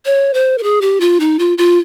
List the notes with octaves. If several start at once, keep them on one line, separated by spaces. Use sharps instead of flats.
C#5
C5
A#4
G#4
G4
F4
D#4
F4
F4